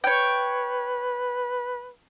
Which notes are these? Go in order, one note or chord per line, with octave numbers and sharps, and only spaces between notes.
B4 C#5 G5